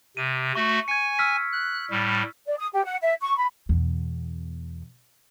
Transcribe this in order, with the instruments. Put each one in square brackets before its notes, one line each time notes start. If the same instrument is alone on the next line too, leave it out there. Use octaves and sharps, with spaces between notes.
[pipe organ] C3 [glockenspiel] D#7
[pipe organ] A3 F#4 [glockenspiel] C#6
[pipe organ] G#5 [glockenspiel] G#6 C#7
[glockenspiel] E6 F6 B6
[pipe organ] F#6
A2 G3
[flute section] D5
D#6
G4
F#5
E5
C#6
B5
[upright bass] E2 B2